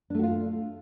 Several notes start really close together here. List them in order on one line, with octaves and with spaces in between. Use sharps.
D4 A3 F#4 F4